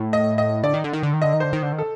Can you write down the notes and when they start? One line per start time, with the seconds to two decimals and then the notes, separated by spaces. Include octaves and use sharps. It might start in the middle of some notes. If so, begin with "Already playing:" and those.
Already playing: A2
0.13 D#5
0.38 D#5
0.63 D3 D5
0.73 D#3
0.84 D3
0.93 D#3
1.03 D3
1.13 D#3
1.22 D3 D#5
1.33 D#3
1.40 D3 C5
1.53 D#3
1.63 D3
1.73 D#3
1.78 A4